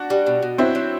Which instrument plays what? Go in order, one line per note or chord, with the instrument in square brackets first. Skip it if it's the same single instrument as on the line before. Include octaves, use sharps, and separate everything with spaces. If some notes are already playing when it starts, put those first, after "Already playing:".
Already playing: [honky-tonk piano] D4 F#4
[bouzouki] G3
B2
B2
[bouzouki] F#3 [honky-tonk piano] C4 E4
[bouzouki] F#3